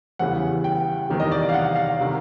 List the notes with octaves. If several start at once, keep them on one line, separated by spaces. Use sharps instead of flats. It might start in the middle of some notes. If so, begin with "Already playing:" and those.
E2 C#3 E3 G3 F#5
G5
E2 C3 D#3 G3
D#5
D5
D5
F5
F#5
F5
C3 D#3